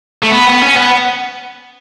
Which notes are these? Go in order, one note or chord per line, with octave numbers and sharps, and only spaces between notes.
A3
B3
B3
C#4
B3